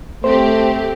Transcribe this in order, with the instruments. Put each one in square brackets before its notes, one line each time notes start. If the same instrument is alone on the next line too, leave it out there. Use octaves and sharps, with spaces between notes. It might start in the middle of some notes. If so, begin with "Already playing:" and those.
[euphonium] A3 [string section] C4 G4 [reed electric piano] C5